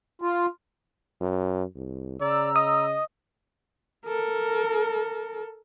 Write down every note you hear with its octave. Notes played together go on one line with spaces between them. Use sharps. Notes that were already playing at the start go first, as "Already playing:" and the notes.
F4
F#2
C2
C#3 D5 A#5 E6
D#5 D#6
A4 A#4